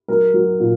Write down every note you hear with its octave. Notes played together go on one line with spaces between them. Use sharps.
F#3 A#4
F#3
A#2